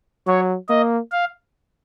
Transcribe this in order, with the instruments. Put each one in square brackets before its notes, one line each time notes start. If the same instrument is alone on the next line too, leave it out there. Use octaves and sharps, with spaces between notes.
[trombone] F#3 [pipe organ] C#5
[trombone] A#3 [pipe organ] D#5
[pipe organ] F5